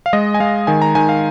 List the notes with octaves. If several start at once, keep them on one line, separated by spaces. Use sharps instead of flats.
F5
G#3 D#5
G#5
G#3 F5
D#3 G#5
A#5
D#3 G#5
F5